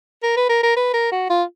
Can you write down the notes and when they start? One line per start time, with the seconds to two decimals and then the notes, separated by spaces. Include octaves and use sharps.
0.23 A#4
0.37 B4
0.49 A#4
0.63 A#4
0.76 B4
0.94 A#4
1.12 F#4
1.30 F4